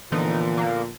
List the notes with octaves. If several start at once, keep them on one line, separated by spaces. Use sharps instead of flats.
A#2 D3 E3 F3 B3 D#4
A#3